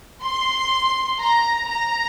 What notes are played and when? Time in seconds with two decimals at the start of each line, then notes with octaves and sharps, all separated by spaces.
0.22 C6
1.19 A#5
1.69 A#5